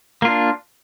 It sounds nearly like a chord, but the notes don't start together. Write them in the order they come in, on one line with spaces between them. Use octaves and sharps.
A#3 F4 D4